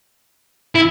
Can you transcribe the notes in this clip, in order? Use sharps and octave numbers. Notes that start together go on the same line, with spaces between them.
E4